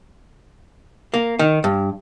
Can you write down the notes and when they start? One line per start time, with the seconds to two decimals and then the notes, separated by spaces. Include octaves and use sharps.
1.14 A#3
1.39 D#3
1.64 G2